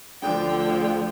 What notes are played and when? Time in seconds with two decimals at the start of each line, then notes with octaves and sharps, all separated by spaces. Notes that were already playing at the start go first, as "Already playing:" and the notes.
0.22 D2 D3 F3 G5
0.55 G5